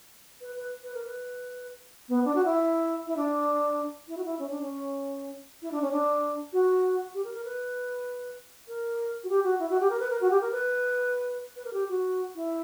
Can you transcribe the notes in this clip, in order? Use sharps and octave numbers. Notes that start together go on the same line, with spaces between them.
B4
B4
B4
A#4
B4
B3
D4
F#4
E4
E4
D4
E4
F#4
E4
C#4
D4
C#4
E4
D4
C#4
D4
F#4
G4
A#4
A#4
B4
A#4
F#4
G4
F#4
E4
F#4
G4
A#4
B4
A#4
F#4
G4
A#4
B4
B4
A#4
G4
F#4
E4